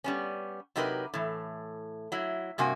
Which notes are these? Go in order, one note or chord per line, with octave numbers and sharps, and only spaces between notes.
G3 B3 C#4
C3 F#3 D#4 G4 A#4 B4
A2 E3
F#3 E4
G2 C3 A#3 F#4 G#5